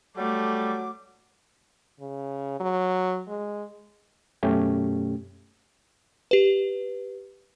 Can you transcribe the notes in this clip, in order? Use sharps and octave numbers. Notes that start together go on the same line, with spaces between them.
F#3 G3 A3 D6
C#3
F#3
G#3
F#2 B2 A3 C#4 G4
G4 B4